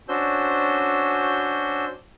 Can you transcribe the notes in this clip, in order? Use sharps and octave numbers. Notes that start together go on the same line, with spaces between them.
C#4 D4 F#4 C5 E6 G6